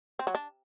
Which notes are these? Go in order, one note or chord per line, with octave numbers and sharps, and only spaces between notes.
C4
F#3
D4